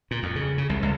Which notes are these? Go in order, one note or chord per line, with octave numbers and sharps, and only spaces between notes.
A#2
F2
C#3
C#3
C2
C#2